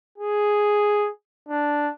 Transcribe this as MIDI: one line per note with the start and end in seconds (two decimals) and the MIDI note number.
0.18 1.09 68
1.49 1.90 62